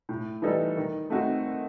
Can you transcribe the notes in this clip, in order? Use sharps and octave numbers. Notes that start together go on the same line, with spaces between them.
A2
E3 G3 D#4 A4
D#3
A3 C4 D#4 F#4